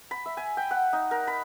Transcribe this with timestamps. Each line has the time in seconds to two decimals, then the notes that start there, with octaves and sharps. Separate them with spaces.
0.11 B5
0.26 E5
0.37 G#5
0.57 G5
0.71 F#5
0.93 D#4
1.11 A#4
1.27 B5